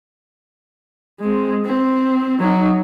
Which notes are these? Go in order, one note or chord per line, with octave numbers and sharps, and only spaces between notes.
G#3 C4
C4
F#3 D#4